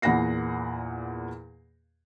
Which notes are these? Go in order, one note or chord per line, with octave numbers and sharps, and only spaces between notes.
E2 A#2 F#5 B5 A#6 C7